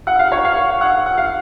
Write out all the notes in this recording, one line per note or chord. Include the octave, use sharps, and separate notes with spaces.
F#5
F5
C#5
F5
F#5
F#5
F5